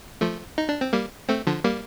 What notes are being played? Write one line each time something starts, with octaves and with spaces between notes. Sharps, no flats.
F3 A3
D#4
D4
C4
G3 A#3
A3 C4
D3 F3
G3 A#3